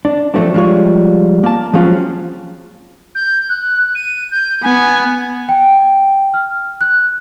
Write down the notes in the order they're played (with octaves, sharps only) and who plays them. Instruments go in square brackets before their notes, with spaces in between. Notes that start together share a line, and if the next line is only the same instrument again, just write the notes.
[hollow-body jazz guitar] D4
F3 F#3 A3 C4 D4
F3 G3 G#3 F4 C#5
A#3 A5
F3 F#3 G#3 C4 C#4 F4
[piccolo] G6
F#6
D#7
G6
[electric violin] B3 [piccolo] G#5
[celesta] G5
F6
F#6